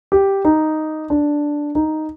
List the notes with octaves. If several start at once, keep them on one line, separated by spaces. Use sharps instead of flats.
G4
D#4
D4
D#4